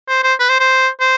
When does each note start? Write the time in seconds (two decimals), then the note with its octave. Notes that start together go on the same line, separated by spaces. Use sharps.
0.08 C5
0.23 C5
0.39 B4
0.49 C5
0.60 C5
1.00 C5